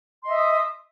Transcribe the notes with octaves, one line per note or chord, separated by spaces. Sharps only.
D#5 E5 C6 D#6